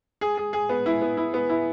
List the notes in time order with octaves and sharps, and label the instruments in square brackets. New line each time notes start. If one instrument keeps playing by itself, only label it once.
[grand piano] G#4
G#4
G#4
B3
E4
B3
E4
B3
E4